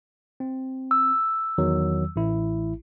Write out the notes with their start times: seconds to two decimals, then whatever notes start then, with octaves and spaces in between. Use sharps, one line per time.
0.40 C4
0.91 E6
1.58 E2 D#3 F#3
2.16 A1 E4